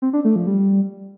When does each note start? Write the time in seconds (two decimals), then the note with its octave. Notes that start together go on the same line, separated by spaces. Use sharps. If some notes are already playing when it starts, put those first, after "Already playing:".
0.02 C4
0.13 D4
0.25 A3
0.36 F3
0.47 G3